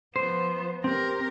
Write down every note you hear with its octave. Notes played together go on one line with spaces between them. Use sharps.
F3 B3 C5
C4 G4 A#4